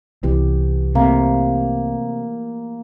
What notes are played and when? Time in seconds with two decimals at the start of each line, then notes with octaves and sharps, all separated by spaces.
0.23 C2 E3 B3 G4
0.95 C3 A3 A#3